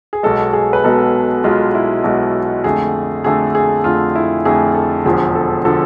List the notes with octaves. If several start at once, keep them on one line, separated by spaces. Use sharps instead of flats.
G#4
B1 B2 G#3 A4
G#4
B4
B1 B2 G#3 A4
B1 B2 G#3 F4
E4
B1 B2 G#3
F2 D3 A3 G#4
F2 D3 A3 G#4
G#4
F2 D3 A3 F4
E4
F2 D3 A3 G#4
A4
E1 E2 D3 F3 G#4
A4
D3 F3 A4